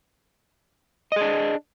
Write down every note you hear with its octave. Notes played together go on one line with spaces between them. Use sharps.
D4 G#4 D#5